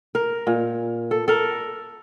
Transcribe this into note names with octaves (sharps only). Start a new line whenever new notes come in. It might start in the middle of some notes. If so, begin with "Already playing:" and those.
A#4
A#2
A4
A4 A#4